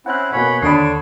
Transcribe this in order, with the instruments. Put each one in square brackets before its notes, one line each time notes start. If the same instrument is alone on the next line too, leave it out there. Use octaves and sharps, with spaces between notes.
[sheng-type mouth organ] C4 C#4 E4 [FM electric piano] F#5 F#6
[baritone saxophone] B2 [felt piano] A#3 G#5 [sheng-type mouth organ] C#5 B5
[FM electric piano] D#2 [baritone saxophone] D3 [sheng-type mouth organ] D4 C#5 [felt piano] B5 D#6 C7